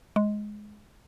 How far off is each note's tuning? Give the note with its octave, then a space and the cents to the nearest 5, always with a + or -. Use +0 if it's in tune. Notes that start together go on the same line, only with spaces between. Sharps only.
G#3 +10